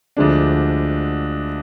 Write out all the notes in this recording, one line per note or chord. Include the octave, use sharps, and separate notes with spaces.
D2 D3 F3 G#3 D4